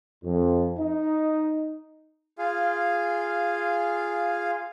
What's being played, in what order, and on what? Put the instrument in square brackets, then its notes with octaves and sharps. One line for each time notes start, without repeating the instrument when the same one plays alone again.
[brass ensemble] F2
D#4
[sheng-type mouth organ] F4 G#4 F5